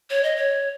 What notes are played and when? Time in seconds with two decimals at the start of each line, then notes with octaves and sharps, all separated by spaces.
0.10 C#5
0.23 D#5
0.37 C#5